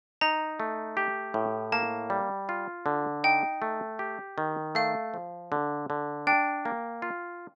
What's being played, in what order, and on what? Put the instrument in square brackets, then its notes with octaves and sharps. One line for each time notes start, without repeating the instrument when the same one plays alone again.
[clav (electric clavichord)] D#4 [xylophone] A#5
[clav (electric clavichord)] A3
G4
A2
[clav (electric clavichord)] A#3 [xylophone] A5
[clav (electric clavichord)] G3
F4
D3
[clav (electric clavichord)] D#4 [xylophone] G5
[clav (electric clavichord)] A3
G4
D#3
[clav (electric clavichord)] A3 [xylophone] F5
[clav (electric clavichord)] F3
D3
D3
[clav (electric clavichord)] D4 [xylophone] G5
[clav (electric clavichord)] A#3
F4